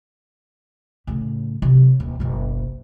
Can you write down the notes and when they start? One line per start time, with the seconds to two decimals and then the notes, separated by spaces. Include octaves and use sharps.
1.07 A2 C#3
1.62 C3 F#3
2.00 D#1
2.20 F#1 B1